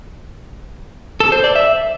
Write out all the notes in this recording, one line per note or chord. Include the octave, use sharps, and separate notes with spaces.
A4
C5
D5
E5